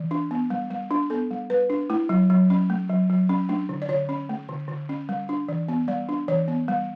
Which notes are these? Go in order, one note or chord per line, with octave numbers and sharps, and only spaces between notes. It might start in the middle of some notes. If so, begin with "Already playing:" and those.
Already playing: E3
D4
B3
G3
G3
D4
B3 A4
G3
G3 B4
D4
A3 E4
F#3
F#3
C#4
A3
F#3
F#3
C#4
A3 D4
D3
D5
D3 C#5
C#4
A3
D3
D3
C#4
G3
D4
E3
B3
G3 D5
D4
E3 C#5
B3
G3